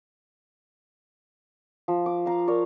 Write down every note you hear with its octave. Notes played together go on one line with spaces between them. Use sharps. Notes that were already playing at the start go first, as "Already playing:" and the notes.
F3
D6
F5 A#5
A#4 C#5 D5